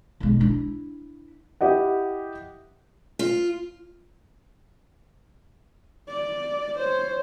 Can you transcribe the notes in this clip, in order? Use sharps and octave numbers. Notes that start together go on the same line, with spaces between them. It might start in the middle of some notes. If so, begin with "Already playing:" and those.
B1 G#3
D4 E4
E4 G4 D#5 F#5
F4
D5
C5 C#5